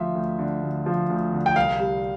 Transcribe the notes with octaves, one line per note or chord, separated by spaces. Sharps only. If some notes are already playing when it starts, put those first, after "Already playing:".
Already playing: D2 F3 E5
D2
D3
D2
F3
D2
D3
G5
C2 F5
G3